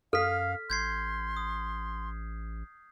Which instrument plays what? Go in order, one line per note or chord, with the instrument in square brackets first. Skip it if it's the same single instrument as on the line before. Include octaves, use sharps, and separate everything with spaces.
[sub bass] F#2 [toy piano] A4 [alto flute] F5 [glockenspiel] F6 B6
[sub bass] A1 [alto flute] C6 [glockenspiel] G6 G#6 C7
[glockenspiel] D#6